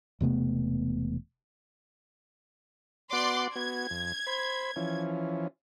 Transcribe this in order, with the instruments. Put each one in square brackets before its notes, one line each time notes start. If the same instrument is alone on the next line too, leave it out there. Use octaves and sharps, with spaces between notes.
[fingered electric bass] E1 C3 A3 B3
[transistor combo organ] B3 F#4 F#5 [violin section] D5 C6 D6
[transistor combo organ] B3 F#4 [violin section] G#6
[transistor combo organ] F2
C5 B5
E3 F3 C#4